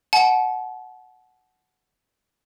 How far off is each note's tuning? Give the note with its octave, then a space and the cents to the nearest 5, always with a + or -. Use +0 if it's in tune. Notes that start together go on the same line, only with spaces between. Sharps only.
F#5 +0 A5 -35